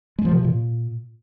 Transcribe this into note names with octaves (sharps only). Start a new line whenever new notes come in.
G#3
F3
C3
E3
A#2